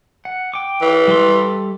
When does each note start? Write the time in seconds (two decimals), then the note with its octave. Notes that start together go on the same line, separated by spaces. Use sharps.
0.25 F#5
0.54 G5 D6
0.82 E3
1.08 G3 A4 C6